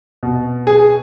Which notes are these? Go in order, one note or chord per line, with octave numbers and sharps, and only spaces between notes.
B2
G#4